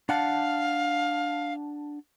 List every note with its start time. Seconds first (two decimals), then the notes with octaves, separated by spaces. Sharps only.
0.09 D4 F5 F#5 A5